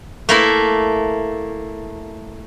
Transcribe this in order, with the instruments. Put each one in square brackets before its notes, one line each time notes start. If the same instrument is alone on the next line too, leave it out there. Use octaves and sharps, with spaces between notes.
[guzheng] A3 A#3 E4